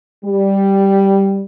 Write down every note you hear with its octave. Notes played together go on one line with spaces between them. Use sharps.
G3